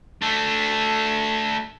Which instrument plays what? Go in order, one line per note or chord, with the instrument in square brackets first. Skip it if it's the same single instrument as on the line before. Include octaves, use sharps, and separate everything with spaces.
[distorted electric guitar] A3 D4